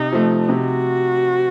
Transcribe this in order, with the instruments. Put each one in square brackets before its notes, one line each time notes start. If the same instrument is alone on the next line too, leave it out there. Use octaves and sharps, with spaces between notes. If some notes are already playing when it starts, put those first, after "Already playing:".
Already playing: [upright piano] C3 [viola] D#4
[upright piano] F3 A3
[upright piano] C3 [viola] F#4